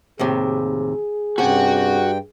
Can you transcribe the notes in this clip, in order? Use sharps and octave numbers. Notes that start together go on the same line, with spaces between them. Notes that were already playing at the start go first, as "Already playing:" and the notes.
D#2 A2 C3 G#4
G2 C3 C#4 F#4 F#5 G5